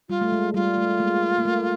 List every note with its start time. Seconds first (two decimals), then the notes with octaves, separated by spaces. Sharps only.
0.09 G3 F4
0.21 A3
0.32 G#3
0.54 G3 F4
0.78 A3
0.99 G#3 A#3
1.38 A#3
1.45 A3